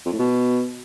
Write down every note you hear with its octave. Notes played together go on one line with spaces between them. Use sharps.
F2
A2
B2